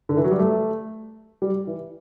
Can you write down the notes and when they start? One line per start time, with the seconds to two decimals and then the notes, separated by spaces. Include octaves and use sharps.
0.09 D3
0.17 E3
0.24 F#3
0.31 G3
0.39 A3
1.42 G3
1.67 E3